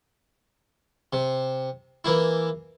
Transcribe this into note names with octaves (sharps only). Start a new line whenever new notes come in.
C3
E3 A#3 E4